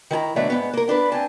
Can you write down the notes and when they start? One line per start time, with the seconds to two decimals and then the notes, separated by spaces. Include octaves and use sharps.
0.11 D#3 E4 G#5 A#5
0.36 B2 D3 F#3 A3 D5 E5
0.50 G#2 D#3 B3
0.73 A#3 A#4
0.88 B3 D4 A#4 B4
1.12 C4 G#5 A5